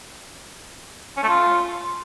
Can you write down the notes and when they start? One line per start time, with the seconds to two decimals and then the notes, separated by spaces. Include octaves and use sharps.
1.17 C#4
1.23 A3
1.28 F4